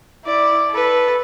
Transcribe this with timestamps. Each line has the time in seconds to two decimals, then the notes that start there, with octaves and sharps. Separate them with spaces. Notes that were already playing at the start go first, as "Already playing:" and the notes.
0.25 E4 D5
0.71 A4 B4